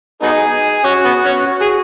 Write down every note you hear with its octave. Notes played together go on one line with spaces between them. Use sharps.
F#3 B3 D#4 G#4
C#4 F#4
B3
C#4
F#4
G#4